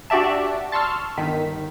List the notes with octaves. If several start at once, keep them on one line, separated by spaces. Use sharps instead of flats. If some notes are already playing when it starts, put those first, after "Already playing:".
D4 F#4 G4 D5 E5 A5
A5 C6 C#6 E6 F6
G1 D#3 B6